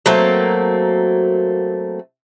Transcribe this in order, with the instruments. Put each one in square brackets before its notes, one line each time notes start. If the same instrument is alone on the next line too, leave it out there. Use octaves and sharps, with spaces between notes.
[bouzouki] F#3 A3 A#3 C4